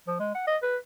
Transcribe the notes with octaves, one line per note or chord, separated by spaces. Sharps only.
F3
G#3
F#5
D#5
B4